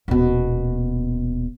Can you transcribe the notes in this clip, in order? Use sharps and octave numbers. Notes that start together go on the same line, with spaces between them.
D#1 B2